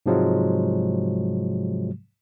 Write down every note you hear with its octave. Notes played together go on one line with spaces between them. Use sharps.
G#2 C3 F3 F#3 G#3